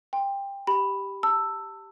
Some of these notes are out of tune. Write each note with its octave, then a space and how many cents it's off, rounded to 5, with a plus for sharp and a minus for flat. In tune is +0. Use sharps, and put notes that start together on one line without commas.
G5 +20 C6 +0
G4 +0 B5 +0
A5 +30 E6 +5